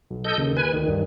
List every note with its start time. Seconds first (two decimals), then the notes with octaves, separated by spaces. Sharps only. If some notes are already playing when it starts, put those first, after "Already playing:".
0.10 B1
0.25 A4 D#5 G6
0.38 D#2 C#3
0.57 B4 G#5
0.73 D2 D#3
0.88 G2